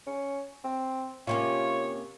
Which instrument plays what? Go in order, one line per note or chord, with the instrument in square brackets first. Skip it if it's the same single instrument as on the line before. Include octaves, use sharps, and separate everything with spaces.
[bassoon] C#4
C4
[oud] C3 A#3 C#4 [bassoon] F4 [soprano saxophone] C#5